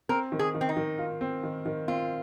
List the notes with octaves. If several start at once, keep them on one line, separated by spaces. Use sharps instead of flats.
C4 A#4
D#3
G#4
D#3
C4
D#4
D#3
F4
C4
D#3
D#3
C4 F4